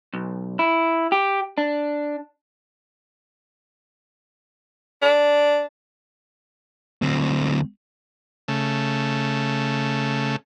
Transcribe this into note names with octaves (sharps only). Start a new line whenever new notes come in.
B1
E4
G4
D4
D4
D2 C4
C#3 A3